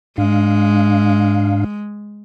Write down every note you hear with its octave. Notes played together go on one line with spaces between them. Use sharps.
G#2 G#3 D4 F5